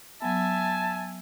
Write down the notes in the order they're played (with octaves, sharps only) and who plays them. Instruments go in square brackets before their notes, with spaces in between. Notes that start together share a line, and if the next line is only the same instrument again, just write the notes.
[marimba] F#3 B3 [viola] E5 [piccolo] G#5 [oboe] A5